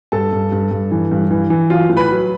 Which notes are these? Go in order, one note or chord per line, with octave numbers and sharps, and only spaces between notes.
G2 A4 A5
G2
G2
G2
E3
G2
E3
E3
F#3 F4 F5
A2
B4 B5
F#3